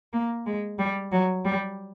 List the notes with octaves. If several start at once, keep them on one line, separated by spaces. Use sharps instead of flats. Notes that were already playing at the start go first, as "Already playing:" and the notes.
A#3
G#3
G3
F#3
G3